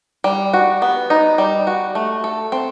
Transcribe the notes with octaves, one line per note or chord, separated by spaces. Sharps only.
G3
F#4
B3
D#4
G3
F#4
A3
A4
C4